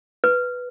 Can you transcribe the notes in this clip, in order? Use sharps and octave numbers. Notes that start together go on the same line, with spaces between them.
B4